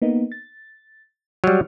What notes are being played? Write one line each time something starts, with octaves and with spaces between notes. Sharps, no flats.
A#3 B3 D#4
A6
F#3 G3 F6